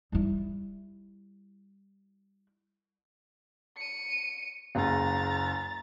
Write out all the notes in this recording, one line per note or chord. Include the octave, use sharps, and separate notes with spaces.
G3 E4
C#7 D#7
F#1 C#2 A#5 A6